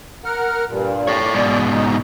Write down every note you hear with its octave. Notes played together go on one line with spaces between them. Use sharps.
A#4 F#5 F6
G2 A#2
A4 C#5
D5
G#2 B2
D#4